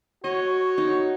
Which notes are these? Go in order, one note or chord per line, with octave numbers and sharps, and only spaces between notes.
F#4 C#5 D#5
D#4